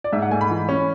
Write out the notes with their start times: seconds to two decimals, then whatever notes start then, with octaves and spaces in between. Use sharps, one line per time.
0.04 D5
0.13 G#2 E5
0.22 F#5
0.31 A3 G#5
0.41 B5
0.50 E3
0.69 C#4